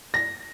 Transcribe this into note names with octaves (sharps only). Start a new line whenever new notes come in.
A#6